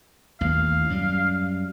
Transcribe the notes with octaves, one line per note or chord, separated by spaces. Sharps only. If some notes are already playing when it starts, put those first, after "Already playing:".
A1 D#2 F5
F#2 G3